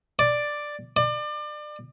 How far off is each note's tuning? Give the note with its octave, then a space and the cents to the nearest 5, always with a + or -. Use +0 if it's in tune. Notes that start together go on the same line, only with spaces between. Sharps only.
D5 +5
D5 +30